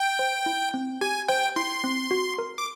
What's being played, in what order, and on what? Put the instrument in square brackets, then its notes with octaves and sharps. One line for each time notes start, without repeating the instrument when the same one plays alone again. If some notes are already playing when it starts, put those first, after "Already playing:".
Already playing: [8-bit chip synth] G5
[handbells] C5
E4
C4
[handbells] G4 [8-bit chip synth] G#5
[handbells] C5 [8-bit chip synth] G5
[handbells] E4 [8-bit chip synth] C6
[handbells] C4
F#4
A#4
[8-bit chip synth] D6